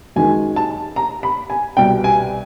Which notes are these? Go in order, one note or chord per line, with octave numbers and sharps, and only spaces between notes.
F#2 D#3 G#3 G#5
A5
A#5
B5
G#5
C2 B2 G3 G5
G#5